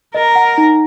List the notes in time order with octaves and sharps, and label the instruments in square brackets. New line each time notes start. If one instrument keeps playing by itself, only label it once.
[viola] A#4 [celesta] D#5
[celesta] F#5
D#4